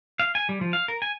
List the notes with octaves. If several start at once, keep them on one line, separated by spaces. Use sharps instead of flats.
F5
G#5
G3
F3
F5
A#4
G#5